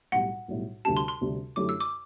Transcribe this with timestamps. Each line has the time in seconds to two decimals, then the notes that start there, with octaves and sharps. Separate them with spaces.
0.12 B1 A2 G3 F#5
0.48 B1 A2 G3
0.85 D2 C3 G3 D4 G4 A5
0.97 C6
1.08 C6
1.21 D2 C3 G3 D4 G4
1.56 F#2 D3 A3 E4 G4 D6
1.69 E6
1.80 D6